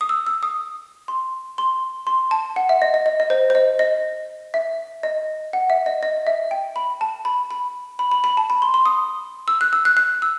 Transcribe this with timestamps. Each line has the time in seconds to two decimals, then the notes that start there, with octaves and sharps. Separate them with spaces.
0.01 D#6
0.09 E6
0.27 E6
0.43 D#6
1.08 C6
1.58 C6
2.07 C6
2.31 A5
2.56 F#5
2.69 E5
2.82 D#5
2.94 D#5
3.06 D#5
3.20 D#5
3.30 C5
3.50 C5
3.55 D#5
3.79 D#5
4.54 E5
5.03 D#5
5.53 F#5
5.70 E5
5.86 D#5
6.03 D#5
6.27 E5
6.51 G5
6.76 B5
7.01 A5
7.25 B5
7.51 B5
7.99 B5
8.11 B5
8.24 B5
8.37 A5
8.50 B5
8.62 C6
8.74 C6
8.86 D#6
9.48 E6
9.61 F#6
9.73 E6
9.85 F#6
9.97 F#6
10.22 E6